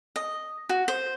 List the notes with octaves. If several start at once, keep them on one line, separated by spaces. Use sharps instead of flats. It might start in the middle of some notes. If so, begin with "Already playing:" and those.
D#5
F#4
C5